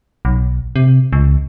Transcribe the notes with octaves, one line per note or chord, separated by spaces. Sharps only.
B1
C3
C#2